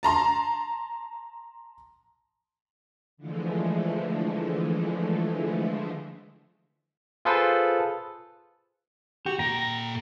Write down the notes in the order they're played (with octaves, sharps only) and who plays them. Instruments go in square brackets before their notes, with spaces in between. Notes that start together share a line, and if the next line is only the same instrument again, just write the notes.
[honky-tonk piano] A5 A#5 C6
[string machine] D3 E3 F3 G#3 A3
[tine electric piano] F4 G#4 A4 B4 C5
[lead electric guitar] F#4 [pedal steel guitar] G4
[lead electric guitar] A#2 G5 [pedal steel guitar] A#5